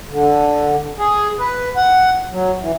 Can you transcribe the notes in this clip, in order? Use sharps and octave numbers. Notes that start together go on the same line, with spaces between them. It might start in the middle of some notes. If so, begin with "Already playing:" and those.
D3
G#4
B4
F#5
F#3
E3